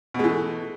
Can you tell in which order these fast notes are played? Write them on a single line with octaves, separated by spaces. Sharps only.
B2 G#3 E3 A3